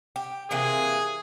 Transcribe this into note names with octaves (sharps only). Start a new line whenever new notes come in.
G4
C3 E3 A#3 G#4